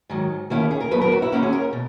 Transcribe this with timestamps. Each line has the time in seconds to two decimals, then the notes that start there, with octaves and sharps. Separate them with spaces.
0.10 G#2 D#3 F#3
0.50 D#2 D#3 A#3 C#4 E4
0.71 G#4
0.80 A#4
0.91 D#2 D#3 F#3 B3 B4
1.01 A#4
1.12 F#4
1.22 E4
1.32 D#2 D#3 A#3 C#4 F#4
1.43 G#4
1.53 A#4
1.73 B2